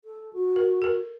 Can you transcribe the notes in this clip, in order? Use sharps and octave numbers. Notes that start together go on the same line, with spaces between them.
A4
F#4
A#4
A4 A#4